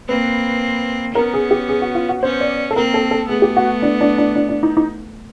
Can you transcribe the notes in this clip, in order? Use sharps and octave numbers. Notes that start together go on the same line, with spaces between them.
A#3 C4 B4
B3 C#4 A#4
G#4
G4
G#4
F#4
F4
F#4
B3 C#4 C5
D5
A4
A#3 C4 A#4
A4
A4
A3 B3 G#4
G4
F#4
D4
D4
D4
D4
D4
D#4
D#4